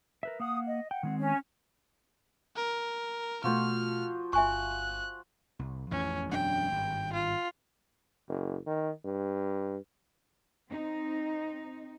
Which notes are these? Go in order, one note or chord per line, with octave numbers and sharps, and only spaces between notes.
A#4 B4 E5
A#3 F5 F#5 D#6
D#5
F#5 G5
D#3 G#3 C4
C#4 C#5 G#5
A#4
B2 F3 A3 F#4 C5 F6
G1 E5 G#5 C#6 F#6
C2
A1 F2 E3 C#4
E1 F#2 D4 G5
G#1 G2
F4
F#1
D#3
G2
C4 D#4